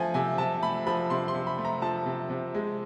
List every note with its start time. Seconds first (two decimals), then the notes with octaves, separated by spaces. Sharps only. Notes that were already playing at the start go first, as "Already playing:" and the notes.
Already playing: F3 A3 G#5
0.14 C3 G#5
0.38 C3 A5
0.63 A3 B5
0.87 F3 B5
1.10 C3 C6
1.28 C6
1.35 C3
1.47 B5
1.58 A3
1.65 A#5
1.82 F3 A5
2.06 C3
2.30 C3
2.55 G#3